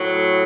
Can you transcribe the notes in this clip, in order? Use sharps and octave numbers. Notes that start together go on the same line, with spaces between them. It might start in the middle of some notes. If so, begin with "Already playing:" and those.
Already playing: A2 F#3